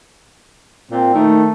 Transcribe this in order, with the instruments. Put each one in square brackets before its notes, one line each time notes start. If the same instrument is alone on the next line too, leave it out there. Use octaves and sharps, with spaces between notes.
[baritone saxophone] A#2 [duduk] C4
[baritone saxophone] D#3 [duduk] A3